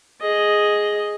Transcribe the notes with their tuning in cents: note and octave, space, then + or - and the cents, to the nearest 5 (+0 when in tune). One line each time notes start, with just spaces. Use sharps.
G#4 +0 D#5 +0